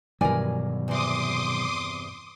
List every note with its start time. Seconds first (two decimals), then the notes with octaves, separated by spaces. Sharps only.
0.21 G2 B2 D#3 E3 F#3 A#4 D5 G#5
0.88 E2 C3 C6 D6 D#6